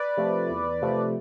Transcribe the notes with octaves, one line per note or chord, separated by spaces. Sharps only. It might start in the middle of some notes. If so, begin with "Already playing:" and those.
Already playing: B4 D5
C3 F3 A3
E2
C3 F3 A3